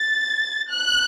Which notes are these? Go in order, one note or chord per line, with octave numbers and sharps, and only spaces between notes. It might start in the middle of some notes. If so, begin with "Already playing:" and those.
Already playing: A6
F#6